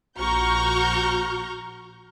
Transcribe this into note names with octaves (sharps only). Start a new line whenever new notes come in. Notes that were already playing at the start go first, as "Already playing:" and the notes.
A#1 F#4 A#5 C#6 F6 G6